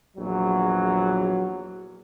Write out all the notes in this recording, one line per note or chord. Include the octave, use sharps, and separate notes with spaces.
A#1 E2 F#3